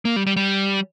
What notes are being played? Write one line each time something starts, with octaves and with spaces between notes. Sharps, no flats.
A#3
G3
G3
G3